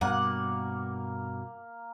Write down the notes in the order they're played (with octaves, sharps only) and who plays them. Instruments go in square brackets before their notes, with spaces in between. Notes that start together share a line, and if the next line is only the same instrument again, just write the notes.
[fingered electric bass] G2 B2 [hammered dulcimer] A#3 [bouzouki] F#5